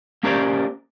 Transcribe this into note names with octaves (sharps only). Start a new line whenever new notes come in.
A#3 C#4 G4 A#4 C5 D5